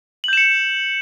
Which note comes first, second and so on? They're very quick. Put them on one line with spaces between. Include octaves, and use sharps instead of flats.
F#7 G6 E7 C#7